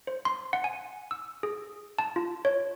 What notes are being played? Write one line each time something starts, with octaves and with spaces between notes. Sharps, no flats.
C5
C6
F#5
G#5
E6
G#4
A5
F4
C#5